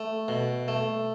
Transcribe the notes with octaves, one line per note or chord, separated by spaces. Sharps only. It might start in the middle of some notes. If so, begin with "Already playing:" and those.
Already playing: A3
B2
A3